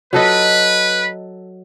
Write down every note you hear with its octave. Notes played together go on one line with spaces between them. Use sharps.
F#3 A4 B4 D#5